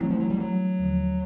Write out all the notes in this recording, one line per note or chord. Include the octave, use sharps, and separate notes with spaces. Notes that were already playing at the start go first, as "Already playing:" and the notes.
E3 F#3 A3 C4 E4
F3
F#3
G3
F#3
D#2 D3 F3